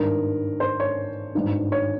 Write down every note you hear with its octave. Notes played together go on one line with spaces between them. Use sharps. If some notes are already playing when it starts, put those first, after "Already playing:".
Already playing: G#1 G2 D#3 A#4
C5
C#5
G#1 G2 D#3
C#5